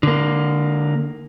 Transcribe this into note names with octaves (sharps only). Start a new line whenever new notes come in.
D3 A#3